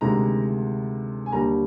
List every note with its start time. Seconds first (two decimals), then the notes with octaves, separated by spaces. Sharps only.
0.01 D2 C3 D#3 G#3 A#5
1.26 G#5
1.32 D#2 D3 G3 A#5